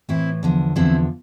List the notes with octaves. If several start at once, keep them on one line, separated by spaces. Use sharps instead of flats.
A2 E3 C4 E4
E2 D3 F3
E2 D3 F3 C4 E4